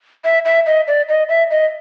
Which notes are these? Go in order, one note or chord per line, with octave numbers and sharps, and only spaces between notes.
E5
E5
D#5
D5
D#5
E5
D#5